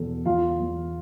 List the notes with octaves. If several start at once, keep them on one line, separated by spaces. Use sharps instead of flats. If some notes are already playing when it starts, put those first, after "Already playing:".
Already playing: E2 B2 A4
E2 F4 F5
E2